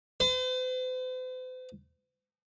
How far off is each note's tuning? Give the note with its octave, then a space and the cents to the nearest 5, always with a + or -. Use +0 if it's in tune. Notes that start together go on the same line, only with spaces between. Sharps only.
C5 -45